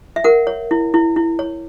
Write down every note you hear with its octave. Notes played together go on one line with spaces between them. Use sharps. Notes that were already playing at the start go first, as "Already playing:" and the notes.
E5
A#4 F#5
C#5
E4
E4
E4
C#5